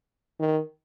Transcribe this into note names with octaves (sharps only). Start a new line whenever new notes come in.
D#3